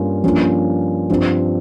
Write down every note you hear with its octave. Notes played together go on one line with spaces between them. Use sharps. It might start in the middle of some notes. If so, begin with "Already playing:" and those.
Already playing: G2 G3 A#3 C#4 F4
G2 F3 A#3 C#4 F4
G2 F3 C4